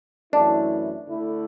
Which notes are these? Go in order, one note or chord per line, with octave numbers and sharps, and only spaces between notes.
F#2 E3 A3 D4 E4
D3 A3 E4